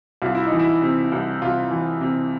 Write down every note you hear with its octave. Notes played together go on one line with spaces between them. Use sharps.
C2 F4
E4
D#4
E3
E4
C3
C2
C2 F4
E3
C3